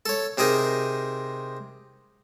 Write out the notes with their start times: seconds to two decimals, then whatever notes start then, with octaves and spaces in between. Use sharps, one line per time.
0.06 A4 C#5
0.38 C3 C4 D#4 G#4 A#4